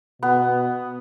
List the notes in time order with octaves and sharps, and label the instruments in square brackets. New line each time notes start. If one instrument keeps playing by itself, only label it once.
[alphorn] B2 [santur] B3